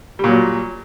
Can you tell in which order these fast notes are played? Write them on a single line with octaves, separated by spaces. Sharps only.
G3 A#2 F#3